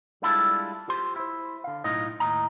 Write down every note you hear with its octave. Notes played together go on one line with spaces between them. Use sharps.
G3 G#3 D4 E4 F4 A4
F4 G4 C5 C6
E4 C5
D3 F5
B1 A2 D#4 F4 D#5
D#2 A2 D#5 A#5